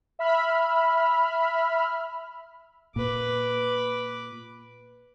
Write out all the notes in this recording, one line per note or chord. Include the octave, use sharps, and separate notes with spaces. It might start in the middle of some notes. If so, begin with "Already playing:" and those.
E5 B5 F6
A#2 B4 D6